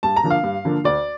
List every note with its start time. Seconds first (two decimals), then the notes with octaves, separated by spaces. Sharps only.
0.03 G2 A5
0.16 A#5
0.23 D3 F3 A#3 D4
0.30 F5
0.43 G2
0.65 D3 F3 A#3 D4
0.84 D2 D5